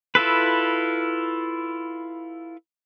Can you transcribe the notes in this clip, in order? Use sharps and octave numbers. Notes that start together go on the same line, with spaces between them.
E4 F4 A4 B4